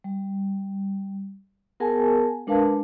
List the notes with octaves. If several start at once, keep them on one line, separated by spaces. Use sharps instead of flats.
G3
B3 G#4 A#4 F#5 G#5 A5
G#3 D4 A#4 B4 F5 A5